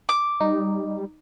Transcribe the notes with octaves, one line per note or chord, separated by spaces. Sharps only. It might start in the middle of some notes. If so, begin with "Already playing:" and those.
D6
G3 D#4